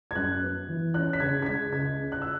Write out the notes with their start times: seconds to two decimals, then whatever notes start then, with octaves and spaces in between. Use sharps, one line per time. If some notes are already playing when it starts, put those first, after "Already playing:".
0.11 G#6
0.15 F#2 F#6
0.42 B3
0.68 E3
0.94 C#4 F#6
1.13 B6
1.20 C#3 G#6
1.42 G#6
1.46 G#3 B6
1.72 C#2 G#6
1.99 C#4
2.12 F#6
2.22 E6